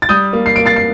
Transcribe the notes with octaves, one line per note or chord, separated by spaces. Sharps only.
A6
G3 D#6 G6
A#3
C7
A#3 D7
A6 C7
C7